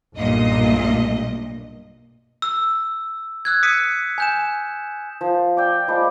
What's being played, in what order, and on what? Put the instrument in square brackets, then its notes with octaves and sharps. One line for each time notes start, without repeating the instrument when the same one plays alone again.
[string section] B1 G2 A#2 D#5
[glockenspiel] E6
E6 F#6 G#6
D#6 B6 C#7 D#7
G#5 G6 E7
[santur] F3
D5 G5 E6
F3 G#3 D5 B5